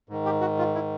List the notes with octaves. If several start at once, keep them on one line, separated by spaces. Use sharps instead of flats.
G#2 D#3
G4
F#4
F4
E4